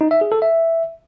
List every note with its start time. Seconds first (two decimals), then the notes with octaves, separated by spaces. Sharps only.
0.01 D#4
0.11 E5
0.21 G#4
0.32 A4
0.42 E5